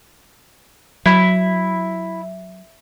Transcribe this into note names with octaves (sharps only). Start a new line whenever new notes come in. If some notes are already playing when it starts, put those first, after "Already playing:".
F#3 E4